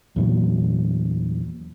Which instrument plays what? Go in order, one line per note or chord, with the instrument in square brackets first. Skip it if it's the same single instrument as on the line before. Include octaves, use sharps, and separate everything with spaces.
[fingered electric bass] E2 A#2 F#3